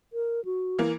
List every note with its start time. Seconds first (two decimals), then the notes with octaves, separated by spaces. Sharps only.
0.13 A#4
0.45 F#4
0.79 E3 A#3